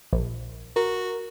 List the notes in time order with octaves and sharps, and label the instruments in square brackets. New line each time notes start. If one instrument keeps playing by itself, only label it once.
[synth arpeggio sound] A#1
[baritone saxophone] F#4 [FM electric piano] A#4